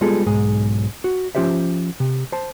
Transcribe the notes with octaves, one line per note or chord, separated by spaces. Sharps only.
G3 G#3 B3 F4 G#4 A4
B1 G#2 G#3 G#4
F#4
F3 C#4 F4 G4 C5 E5
C3
C5 A5